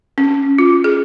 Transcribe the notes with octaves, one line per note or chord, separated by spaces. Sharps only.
C#4
F4
G#4